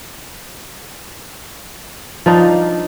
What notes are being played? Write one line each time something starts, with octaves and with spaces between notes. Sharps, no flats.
F3 D4 D#4